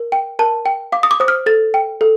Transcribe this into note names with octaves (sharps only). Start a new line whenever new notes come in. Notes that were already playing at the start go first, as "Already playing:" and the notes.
Already playing: A#4
G5
A#4 A5
G5
F5 D6
D#6
D6
C5 D#6
F6
A4 A6
G5
A4